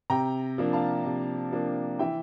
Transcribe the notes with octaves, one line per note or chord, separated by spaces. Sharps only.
C3 G5 A#5
F3 A#3 D4
F5 A5
C3
F3 A#3 D4
E3 E5 G5